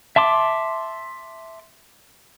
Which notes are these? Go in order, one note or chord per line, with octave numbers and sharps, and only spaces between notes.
E5 A5 C6 D6